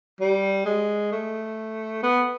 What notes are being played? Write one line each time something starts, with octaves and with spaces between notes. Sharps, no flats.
G3
G#3
A3
B3